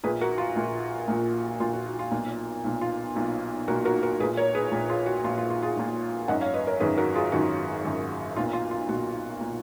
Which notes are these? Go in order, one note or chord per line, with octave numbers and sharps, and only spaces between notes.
A#1 A#2 G#4 B4
F#4 A#4
F4
A#1 A#2
A#1 A#2
A#1 A#2 F4
F#4
F#4
F4
B1 A#2
B1 A#2
F4
B1 A#2
B1 A#2 F#4 A#4
F#4 A#4
F#4 A#4
A#1 A#2 G#4 B4
A#4 C#5
G#4 B4
A#1 A#2
F4 G#4
F#4
A#1 A#2 F4
F4
F4
F4 G#4
A#1 A#2
G#1 F#2 D#3 D#5 F#5
C#5 F5
B4 D#5
A#4 C#5
G#1 F#2 D#3 G#4 B4
F#4 A#4
F4 G#4
G#1 F#2 D#3 F#4
G#1 F#2 D#3
B1 A#2 F4
F4
F4
B1 A#2 F#4
A#2